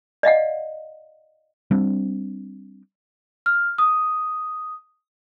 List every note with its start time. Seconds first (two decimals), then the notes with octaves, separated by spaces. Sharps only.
0.23 D5 D#5 F5 F#5
1.71 G3 C4 D4
3.46 F6
3.78 D#6